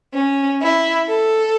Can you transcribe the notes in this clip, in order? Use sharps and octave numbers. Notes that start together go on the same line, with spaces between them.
C#4
E4
A4